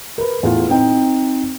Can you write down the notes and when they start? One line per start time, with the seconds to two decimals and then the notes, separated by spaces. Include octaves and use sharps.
0.18 A#4 B4
0.43 E2 A2 F4
0.69 C4 D#4 G5